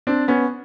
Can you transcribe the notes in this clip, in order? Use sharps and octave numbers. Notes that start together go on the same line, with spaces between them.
C4 D4
B3 C#4